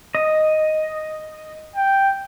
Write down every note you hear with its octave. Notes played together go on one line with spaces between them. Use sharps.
D#5
G5